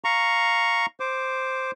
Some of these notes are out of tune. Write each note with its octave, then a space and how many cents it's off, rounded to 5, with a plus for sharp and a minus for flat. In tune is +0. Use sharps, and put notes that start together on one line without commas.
F5 +0 A#5 +0 C#6 +0
C5 +0 D6 +0